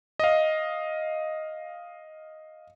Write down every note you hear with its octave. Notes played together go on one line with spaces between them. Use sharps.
D#5 F5